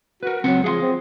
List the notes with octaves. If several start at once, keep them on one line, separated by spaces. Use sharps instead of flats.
F#4 A#4 B4
C#2 F#3 C4 F#5
F3 G#4 F5 C6
C4